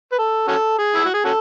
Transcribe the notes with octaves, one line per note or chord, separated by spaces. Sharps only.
B4
A4
C#4 F#4 A4
G#4
E4
F#4
G#4
C#4 F#4 A4